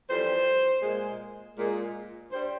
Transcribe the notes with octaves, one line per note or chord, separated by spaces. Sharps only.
F2 E3 G3 C5
A#2 G#3
A#2 G#3
G2 G3 C5